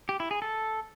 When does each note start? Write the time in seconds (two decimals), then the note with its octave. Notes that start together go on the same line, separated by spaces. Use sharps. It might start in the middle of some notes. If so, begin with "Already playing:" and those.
0.09 G4
0.20 E4
0.31 G#4
0.42 A4